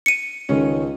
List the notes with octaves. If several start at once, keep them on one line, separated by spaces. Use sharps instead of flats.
C#7 D#7
C#2 D#3 G#3 C#4